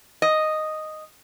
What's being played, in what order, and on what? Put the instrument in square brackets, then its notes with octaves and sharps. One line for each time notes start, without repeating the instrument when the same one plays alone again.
[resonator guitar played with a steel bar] D#5